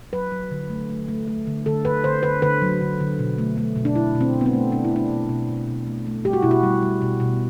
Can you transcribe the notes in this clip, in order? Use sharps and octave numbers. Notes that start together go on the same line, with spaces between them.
F#3 B4
F#3
D3
A3
A3
A3
A3
D3
D3 A4
D3 B4
D3 C5
D3 B4
D3 B4
F#3
D3
D3
B2
A3
A3
B2
D4
B2 E4
B2
C4
B2
B3
C4
A3
B2 D4
E4
A3 D4
B2
B2
B2
B2
A3
A3
G3 G4
F#4
B2 E4
F#4
G3
G3
B2
B2